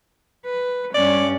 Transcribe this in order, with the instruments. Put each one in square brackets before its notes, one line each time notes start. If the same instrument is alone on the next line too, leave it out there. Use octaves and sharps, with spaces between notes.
[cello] B4
[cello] G2 C#4 [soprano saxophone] D5